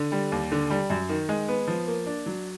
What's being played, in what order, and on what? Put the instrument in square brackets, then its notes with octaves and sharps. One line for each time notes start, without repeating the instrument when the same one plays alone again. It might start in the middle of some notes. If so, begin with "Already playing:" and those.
Already playing: [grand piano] D3
G3
D#2
D3
G3
F#2
D#3
G#3
B3
F3
A#3
D4
F#3